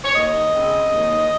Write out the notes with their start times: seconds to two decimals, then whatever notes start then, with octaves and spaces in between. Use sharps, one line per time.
0.04 C#5
0.13 D#2 D#5
0.53 C#3 G#3 C4
0.92 D#2